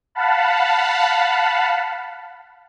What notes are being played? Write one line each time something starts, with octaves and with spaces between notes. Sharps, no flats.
F5 F#5 A5 B5